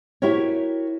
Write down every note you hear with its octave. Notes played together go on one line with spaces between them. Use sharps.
E4 F#4 G4 A#4 C#5